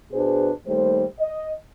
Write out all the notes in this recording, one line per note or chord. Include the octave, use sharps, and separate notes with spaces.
B2 D4 G#4 B4 C5
D#2 G3 A3 C5
D#5